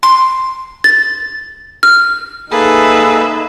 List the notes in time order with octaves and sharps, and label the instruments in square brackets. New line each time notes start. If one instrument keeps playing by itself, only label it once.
[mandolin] C6
[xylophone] A6
F6
[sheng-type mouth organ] A#3 A4 [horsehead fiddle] D#4 E5 [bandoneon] G#4 [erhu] B4